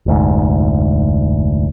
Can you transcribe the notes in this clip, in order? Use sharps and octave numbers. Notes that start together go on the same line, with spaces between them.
F1 D2 G#2